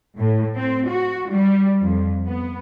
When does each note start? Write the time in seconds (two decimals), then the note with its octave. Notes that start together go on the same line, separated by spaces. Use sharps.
0.17 A2
0.56 C4
0.88 F#4
1.30 G3
1.82 F2
2.26 B3